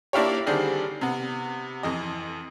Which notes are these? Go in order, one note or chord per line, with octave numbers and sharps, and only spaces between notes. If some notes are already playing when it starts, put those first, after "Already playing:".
A#3 D4 E4 F4 G4 C#5
D3 D#3 G3 C4 D4 G#4
C3 B3
F2 E3 D#5